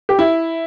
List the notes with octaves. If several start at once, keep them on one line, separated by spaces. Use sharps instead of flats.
G4
E4